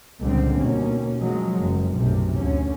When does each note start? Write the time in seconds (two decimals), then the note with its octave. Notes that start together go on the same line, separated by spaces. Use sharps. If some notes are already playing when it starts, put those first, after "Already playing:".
0.20 C#2 A#2 D3 G3 C4
0.57 D#2 B2 C#4
1.20 F3 F#3 G#3
1.59 F#1
1.93 B1 F#2 A2 C3
2.35 D2 D3 C#4